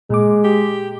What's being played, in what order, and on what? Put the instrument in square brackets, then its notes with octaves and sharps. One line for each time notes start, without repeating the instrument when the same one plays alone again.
[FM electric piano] A#2 D6 [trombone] G#3
[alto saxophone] G4